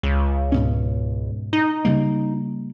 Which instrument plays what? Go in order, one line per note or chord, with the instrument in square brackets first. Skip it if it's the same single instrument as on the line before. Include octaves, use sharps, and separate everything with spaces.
[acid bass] C#2
[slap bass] G#2 B2 C#4
[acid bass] D#4
[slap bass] C#3 G3 A#3